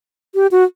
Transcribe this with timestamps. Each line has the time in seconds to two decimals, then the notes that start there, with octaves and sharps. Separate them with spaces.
0.35 G4
0.51 F#4